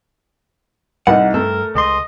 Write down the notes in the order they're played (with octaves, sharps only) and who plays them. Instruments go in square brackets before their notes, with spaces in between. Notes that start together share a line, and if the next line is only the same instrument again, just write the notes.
[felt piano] C2 D#4 [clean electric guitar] F#5
[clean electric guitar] G2 A4 [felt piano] A3 [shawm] A#4
[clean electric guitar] C#2 C6 [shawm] D#5